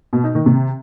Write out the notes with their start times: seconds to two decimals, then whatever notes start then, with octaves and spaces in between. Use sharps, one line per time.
0.13 B2
0.24 D#4
0.35 D#3
0.46 C3